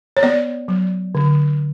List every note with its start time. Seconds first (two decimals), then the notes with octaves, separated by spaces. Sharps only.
0.17 C#5
0.23 B3 D5
0.68 F#3
1.15 D3